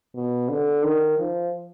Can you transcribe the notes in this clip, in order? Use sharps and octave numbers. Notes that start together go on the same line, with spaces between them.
B2
D3
D#3
F3